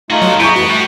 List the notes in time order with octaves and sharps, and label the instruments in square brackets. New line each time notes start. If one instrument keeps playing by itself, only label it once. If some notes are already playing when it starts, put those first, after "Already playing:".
[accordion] A3 D#4 F4 [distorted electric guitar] F#4 G#4
[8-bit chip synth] F#3
[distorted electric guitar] B3 [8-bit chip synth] E4 [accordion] G#4 A#5 B5 [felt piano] C#6 G6 D7
[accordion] F2 A2 E3 [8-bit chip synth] F#4
[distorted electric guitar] G3 [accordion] A3